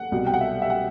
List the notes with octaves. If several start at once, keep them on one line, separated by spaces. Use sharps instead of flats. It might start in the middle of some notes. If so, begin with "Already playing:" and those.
Already playing: F#5
C2 B2 G3
G5
F#5
E5
E5
F#5